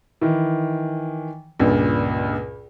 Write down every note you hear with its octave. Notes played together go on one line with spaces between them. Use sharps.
D#3 E3
C#2 G2 A#2